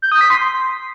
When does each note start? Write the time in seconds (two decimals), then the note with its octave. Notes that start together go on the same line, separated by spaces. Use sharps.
0.02 G6
0.12 D#6
0.21 B6
0.30 C6